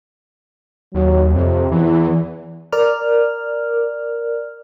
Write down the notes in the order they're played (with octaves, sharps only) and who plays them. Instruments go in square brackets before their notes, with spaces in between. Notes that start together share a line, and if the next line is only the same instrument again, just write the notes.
[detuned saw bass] D#2 [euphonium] F#3
[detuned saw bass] F2 [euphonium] C3
[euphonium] E2 [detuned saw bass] E3
[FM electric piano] A#4 D5 F6